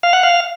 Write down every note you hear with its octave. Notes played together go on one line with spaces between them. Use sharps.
F5
F#5
F5